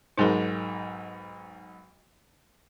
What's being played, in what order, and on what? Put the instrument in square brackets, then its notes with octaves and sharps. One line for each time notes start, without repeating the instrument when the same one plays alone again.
[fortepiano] B1 G#2 C5 [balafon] D#4 G#4 A#4